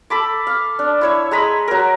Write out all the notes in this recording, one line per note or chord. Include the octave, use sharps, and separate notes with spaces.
A4 B5 D6
F5
D4
E4 C#5 E6
G#3 A#5 B5 D#6
F#3 A#4